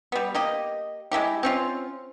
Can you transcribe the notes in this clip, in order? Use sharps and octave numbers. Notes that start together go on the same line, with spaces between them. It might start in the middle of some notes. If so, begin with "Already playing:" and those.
G3 B3
A#3 G4 D#5
G#3 A#3 E4 G4
C4 C#4 F4